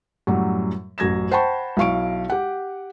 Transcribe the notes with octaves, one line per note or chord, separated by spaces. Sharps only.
F#2 A2 F#3 G3
A1 F#2 G#6 A#6 E7
C5 F#5 G5 A5 B5 C#6
B1 E4 F5 C#6 D7
G4 F#5